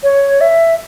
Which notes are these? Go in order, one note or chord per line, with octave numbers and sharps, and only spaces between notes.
C#5
E5